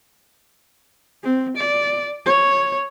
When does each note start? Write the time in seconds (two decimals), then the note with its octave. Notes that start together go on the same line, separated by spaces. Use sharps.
1.23 C4
1.57 D5
2.26 C#5